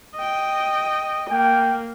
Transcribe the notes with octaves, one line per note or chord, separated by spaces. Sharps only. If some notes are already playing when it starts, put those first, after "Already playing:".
D#5 G5
A#3 G5